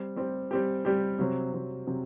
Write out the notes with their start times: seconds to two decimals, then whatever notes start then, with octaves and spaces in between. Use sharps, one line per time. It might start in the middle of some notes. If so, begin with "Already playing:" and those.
Already playing: G3 C4 G4
0.16 G3 C4 G4
0.51 G3 C4 G4
0.85 G3 C4 G4
1.19 C3 F#3 C4
1.53 C3 F#3 C4
1.87 C3 F#3 C4